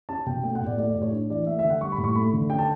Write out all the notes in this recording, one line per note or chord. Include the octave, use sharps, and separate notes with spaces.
C#4 A5
B2 G5
A3 G5
F#5
A2
D5
A3 D5
D5
A2
C#5
D4
E3 D5
A3 E5
E5
D3
F#5
G3 C#6
B5
A2
C#6
A3 B5
D3
C#4 G5
A5